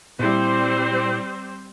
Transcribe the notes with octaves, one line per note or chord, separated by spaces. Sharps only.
A#2 G3 C4 E4 C5